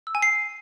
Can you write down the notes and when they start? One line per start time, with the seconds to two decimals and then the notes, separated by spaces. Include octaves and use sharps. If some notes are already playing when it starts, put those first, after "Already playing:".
0.07 E6
0.15 G#5
0.22 C7